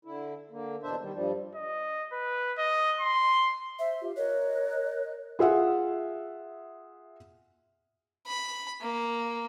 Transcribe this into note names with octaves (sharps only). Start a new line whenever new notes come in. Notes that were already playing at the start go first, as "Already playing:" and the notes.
D3 E4
D3 A#3
E2 B2 D4 C5 E5
D#3 G3
G2 F3 G3
D#5
B4
D#5
C6
C5 E5
F4 G4
A#4 C#5 D#5 F#6
F4 G#4 E5 F#5
B5
A#3